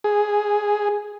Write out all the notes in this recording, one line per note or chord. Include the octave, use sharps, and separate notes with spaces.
G#4